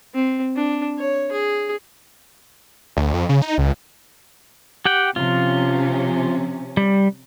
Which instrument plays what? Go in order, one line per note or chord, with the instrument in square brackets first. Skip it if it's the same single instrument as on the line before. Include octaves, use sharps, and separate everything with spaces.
[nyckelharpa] C4
D4
C#5
G#4
[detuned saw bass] D2
F2
C#3
D#4
C#2
[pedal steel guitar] G4 F#5 G5
[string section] C3 F3 C#4 [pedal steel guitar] F4
[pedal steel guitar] G3